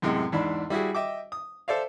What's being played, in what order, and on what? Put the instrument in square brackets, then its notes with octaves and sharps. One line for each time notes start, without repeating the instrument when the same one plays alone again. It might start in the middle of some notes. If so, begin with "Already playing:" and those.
[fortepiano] F#2 A2 C3 G#3
E2 G#2 D4 B5
G3 E4 F#4 G#4
D#5 E5 G5 D6
D#6
A4 C5 D5 E5 F5